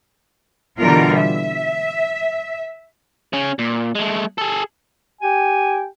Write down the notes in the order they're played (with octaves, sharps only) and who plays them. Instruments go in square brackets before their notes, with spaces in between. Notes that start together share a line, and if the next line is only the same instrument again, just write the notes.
[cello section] B2 D3 E3 G3 F4 A#4
E5
[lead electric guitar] C#3 C#4
A#2
G#3 A3
G#4 A4
[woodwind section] G4 G5 G#5